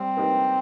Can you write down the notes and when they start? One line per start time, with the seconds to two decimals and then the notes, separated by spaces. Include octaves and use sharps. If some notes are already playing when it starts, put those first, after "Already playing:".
Already playing: G3 C4
0.17 A#3 D#4 G4 B4